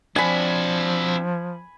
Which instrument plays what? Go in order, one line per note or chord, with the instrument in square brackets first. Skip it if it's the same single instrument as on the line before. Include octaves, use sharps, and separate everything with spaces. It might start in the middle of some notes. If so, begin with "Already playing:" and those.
[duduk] F3 [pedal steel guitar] C4 D4 [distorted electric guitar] E4 F#4 [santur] G#5 B5